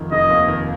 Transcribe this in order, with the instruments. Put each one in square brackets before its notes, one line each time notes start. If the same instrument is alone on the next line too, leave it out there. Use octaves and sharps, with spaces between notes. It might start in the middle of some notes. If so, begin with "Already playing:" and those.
Already playing: [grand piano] F1 D#3
[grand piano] F1 [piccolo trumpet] D#5
[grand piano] D#2
D#3